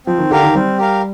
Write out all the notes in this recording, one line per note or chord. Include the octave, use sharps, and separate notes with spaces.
F3 C4
D#3
D3 G4 A#4 F5
D#3
G3 C4
G4 A#4 F5